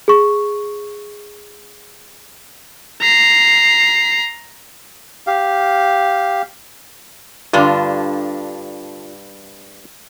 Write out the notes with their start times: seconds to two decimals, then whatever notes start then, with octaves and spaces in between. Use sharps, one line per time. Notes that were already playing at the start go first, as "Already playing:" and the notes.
0.08 G#4 C#6
3.02 A#5 C7
5.27 G4 F5
7.53 G2 D3 D4 F4